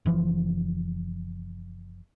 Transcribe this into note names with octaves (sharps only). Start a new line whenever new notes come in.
F#1 E3 F3